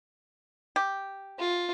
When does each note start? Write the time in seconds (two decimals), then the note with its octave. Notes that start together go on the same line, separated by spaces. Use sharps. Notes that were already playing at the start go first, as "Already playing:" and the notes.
0.76 G4
1.39 F4